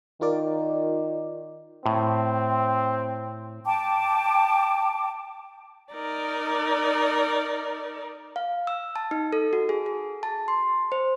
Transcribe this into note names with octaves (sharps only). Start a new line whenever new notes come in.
D#3 F4 A#4 D5
A2 C4
G5 A5 D6
D#4 A#4 D5
F5
E6
A5
D#4
A4
F#4
G#4
G#4
A5
C6
C5